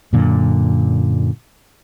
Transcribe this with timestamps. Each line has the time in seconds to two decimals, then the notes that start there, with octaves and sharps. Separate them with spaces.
0.13 F#2 A#2 D3